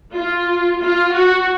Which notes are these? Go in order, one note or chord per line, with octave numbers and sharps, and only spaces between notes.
F4
F4
F#4